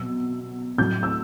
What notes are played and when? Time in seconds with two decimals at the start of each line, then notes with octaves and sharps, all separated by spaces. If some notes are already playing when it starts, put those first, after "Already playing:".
Already playing: B2 F#3 E6
0.78 A2 F#3 G6
1.03 E6